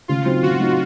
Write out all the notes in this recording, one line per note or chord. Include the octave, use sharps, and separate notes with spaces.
C#3 F4
F#3 C4 D#4
C#3 F#4
F#3 C4 D#4